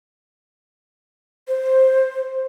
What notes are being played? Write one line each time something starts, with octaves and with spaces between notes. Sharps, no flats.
C5